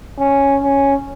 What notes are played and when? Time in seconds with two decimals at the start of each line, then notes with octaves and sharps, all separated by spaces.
0.20 C#4
0.63 C#4